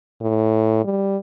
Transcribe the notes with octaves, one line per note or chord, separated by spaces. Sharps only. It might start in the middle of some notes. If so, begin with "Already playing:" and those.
A2
G3